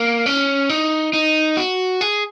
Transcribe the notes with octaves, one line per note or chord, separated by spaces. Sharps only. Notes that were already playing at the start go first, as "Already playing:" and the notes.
Already playing: A#3
C#4
D#4
D#4
F#4
G#4